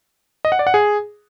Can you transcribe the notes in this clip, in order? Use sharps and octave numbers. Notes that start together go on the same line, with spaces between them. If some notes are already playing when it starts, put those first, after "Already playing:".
D#5
F#5
D5
F#5
G#4